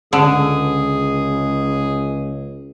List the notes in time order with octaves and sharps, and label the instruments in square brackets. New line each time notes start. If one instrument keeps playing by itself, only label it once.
[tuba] C#2 [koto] D3 [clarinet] G#4